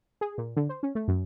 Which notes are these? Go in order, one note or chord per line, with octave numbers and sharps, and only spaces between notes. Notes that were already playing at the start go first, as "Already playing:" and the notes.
G#4
A#2
D3
C5
C#4
A3
F#2